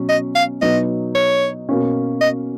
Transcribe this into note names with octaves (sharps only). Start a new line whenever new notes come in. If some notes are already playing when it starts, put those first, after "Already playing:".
Already playing: B2 F#3 C#4
D#5
F5
B2 F#3 B3 D#4 D#5
C#5
B2 A#3 C#4
D#5